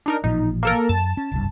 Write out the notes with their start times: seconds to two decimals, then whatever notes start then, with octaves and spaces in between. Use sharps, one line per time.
0.06 D4 D#4 A#4
0.24 A1 A#2 F3 D#4
0.63 A#3 A4 A#4
0.89 F#2 A5
1.17 C#4
1.32 F#1 C2 G2